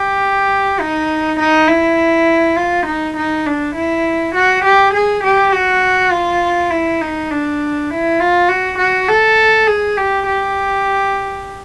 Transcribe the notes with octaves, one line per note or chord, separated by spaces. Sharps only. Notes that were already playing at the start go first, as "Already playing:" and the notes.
Already playing: G4
D#4
D#4
E4
F4
D#4
D#4
D4
E4
F#4
G4
G#4
G4
F#4
F4
E4
D#4
D4
E4
F4
F#4
F#4
A4
G#4
G4
G4